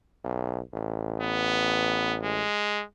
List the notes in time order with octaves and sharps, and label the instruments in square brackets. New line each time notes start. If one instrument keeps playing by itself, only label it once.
[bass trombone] B1
A1
[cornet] B3
G#3